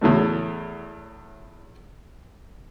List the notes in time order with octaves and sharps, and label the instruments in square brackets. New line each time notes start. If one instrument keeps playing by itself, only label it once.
[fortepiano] E2 A2 F#3 A3